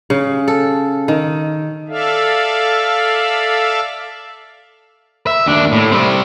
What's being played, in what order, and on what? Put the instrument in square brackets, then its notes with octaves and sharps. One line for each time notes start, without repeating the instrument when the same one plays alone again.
[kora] C#3
A4
D#3
[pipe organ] A4 D5 E5 F5
[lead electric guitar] E5
D#2 D4
A2
G3 C4